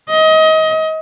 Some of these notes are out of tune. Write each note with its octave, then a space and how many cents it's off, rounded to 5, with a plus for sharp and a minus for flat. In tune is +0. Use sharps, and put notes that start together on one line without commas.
D#5 +25